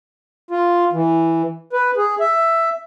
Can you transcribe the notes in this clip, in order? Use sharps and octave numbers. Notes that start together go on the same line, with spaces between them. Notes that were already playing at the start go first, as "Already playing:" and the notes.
F4
E3
B4
G#4
E5